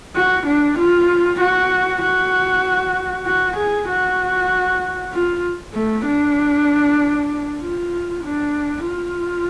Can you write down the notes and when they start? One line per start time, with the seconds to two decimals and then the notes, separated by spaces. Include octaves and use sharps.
0.15 F#4
0.47 D4
0.79 F4
1.41 F#4
2.02 F#4
3.26 F#4
3.57 G#4
3.88 F#4
5.13 F4
5.74 A3
6.06 D4
7.61 F4
8.23 D4
8.85 F4